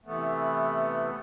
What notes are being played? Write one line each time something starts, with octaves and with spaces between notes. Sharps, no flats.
C3 E3 A3 B3